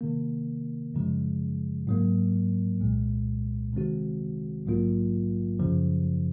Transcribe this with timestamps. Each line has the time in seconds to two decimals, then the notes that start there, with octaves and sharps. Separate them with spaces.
0.01 C3 D#3 A#3
0.94 F#2 C#3 F3 G#3
1.87 G#2 F#3 A#3
2.80 C2 A#2 G#3
3.73 C3 D#3 G#3 C4 F#4
4.66 A#1 G#2 F#3 A#3 F4
5.59 F#2 C#3 F3